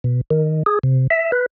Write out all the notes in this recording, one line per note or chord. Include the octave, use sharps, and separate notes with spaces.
B2
D#3
G#4
C3
E5
B4